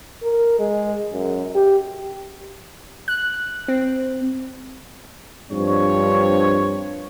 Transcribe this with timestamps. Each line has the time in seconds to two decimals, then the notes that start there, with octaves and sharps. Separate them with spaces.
0.22 A#4
0.59 G#3
1.13 F#2
1.55 G4
3.08 F#6
3.68 C4
5.51 G2 F3 C4 D4 C#5